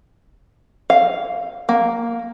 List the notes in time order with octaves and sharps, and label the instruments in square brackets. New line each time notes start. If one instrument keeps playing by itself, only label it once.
[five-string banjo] F5
A#3